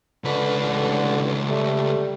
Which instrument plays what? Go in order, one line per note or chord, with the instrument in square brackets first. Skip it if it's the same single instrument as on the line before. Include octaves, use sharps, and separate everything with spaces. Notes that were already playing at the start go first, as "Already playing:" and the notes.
[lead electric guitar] C#2 B4 [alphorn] D3
[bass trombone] A1 [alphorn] D3
[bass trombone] G3 [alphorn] A3